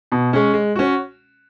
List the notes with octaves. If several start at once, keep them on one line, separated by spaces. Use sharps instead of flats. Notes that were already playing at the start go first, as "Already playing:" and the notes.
B2
G#3 C#4
G#3
C#4 F#4